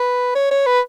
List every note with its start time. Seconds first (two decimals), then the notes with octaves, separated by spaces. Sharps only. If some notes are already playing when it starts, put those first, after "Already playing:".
Already playing: B4
0.35 C#5
0.51 C#5
0.66 B4